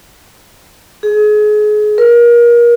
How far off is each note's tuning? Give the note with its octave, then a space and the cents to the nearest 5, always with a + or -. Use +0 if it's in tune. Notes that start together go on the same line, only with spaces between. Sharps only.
G#4 +30
A#4 +30